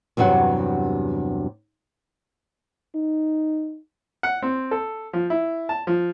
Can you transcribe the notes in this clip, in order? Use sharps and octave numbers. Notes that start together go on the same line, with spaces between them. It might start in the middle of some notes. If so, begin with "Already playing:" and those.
E2 G2 C3 F#3 F#5
D#4
F#5
C4
A4
F3
E4
A5
F3